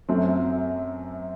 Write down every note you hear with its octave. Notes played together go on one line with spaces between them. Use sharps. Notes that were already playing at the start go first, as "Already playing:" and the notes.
F#2 F#3 A3 C4